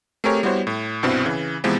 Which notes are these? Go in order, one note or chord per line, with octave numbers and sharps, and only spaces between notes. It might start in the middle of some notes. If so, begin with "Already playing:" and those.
A3 C4 G4 G#4 A#4 C#5
G3 B3 E4 F#4 C5 C#5
A2
C2 G2 B2 C4 E4
C#3 E3
C3 E3 F3 G#3 B3 C4